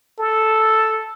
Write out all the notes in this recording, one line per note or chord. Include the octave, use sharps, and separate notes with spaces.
A4